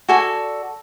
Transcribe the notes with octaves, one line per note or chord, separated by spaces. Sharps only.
F#4 A4 D5 G#5